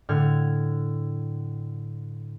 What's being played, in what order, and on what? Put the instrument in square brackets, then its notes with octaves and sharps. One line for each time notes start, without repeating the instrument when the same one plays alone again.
[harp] A2 D3 F6 G#6